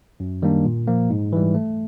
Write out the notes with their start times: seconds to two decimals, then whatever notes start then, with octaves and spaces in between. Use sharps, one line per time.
0.20 F#2
0.42 D#3 G3 A#3 D4
0.65 A#2
0.87 F3 A#3
1.10 G#2
1.33 E3 G3
1.54 A3